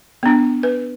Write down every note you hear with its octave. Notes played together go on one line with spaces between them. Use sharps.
B3 D4
B4